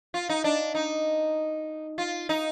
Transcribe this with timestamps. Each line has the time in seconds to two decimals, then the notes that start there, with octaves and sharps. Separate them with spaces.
0.14 F4
0.29 D#4
0.44 D4
0.75 D#4
1.98 F4
2.29 D#4